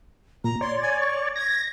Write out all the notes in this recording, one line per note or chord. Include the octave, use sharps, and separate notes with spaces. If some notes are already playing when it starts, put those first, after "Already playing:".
A#2 A#5
C#5 D5 C6
G#5
C#6
G#6 A#6